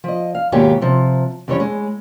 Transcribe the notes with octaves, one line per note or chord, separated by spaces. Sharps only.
F3 D#5
F5
D#2 G#2 B2 F4 G4 C#5
C3 F3
F2 E3 G3 C#4 C#5
G#3